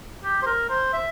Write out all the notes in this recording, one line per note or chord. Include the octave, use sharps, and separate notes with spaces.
G4
C5
A#4
C5
E5